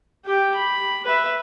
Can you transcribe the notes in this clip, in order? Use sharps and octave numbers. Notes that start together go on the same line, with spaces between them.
G4 G5
B5
B4 E5